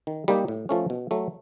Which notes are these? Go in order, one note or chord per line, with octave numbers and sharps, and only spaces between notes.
D#3
G3 A#3 D#4 G4
A2
F3 A3 C#4
B2
F#3 A3